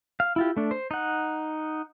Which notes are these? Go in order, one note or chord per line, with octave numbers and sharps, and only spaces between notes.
F5
E4 F4 G4
A3 D4
C5
D#4 F#5